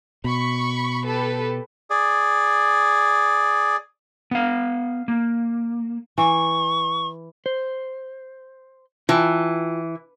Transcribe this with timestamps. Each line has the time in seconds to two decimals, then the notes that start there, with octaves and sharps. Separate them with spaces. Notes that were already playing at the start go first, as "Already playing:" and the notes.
0.24 B2 B5 C#6
1.05 G4 A4 B4
1.90 G#4 D5
4.31 B3 F5
5.08 A#3
6.18 E3 C#6
7.46 C5
9.09 E3 F4 G5 A5